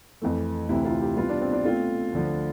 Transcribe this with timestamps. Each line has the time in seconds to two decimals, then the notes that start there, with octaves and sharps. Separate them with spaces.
0.22 F2 E3 A3
0.69 D2 C3 E3 E4
0.85 F4
1.01 G4
1.17 B2 G3 B3 F4
1.29 D4
1.41 C4
1.53 D4
1.65 B2 A3 C4 F4
2.12 D2 D3 F3